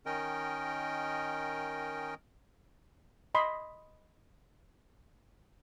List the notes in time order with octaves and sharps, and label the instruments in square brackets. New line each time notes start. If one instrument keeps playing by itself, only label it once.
[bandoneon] D#3 C#4 A#4 D#5 G5
[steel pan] D#5 B5 C6